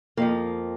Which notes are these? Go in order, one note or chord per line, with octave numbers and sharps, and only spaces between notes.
F2 F3 A#3